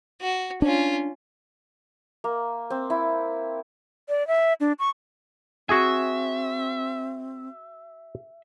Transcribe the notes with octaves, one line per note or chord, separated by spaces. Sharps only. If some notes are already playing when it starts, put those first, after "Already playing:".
F#4
C#4 D4 F4
A#3
C4
E4
D5
E5
D4
C#6
C4 F#4 G#4 E5 G#5